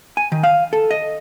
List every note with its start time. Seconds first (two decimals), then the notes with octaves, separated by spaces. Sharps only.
0.17 G#5
0.32 D#3
0.43 F5
0.73 A4
0.91 D#5